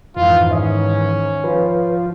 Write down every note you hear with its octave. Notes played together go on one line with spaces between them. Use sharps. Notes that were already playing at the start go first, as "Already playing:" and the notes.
F2 G#2 D#3 E3 F4
C#4 E5 D#6
F3 F4 B4 C#5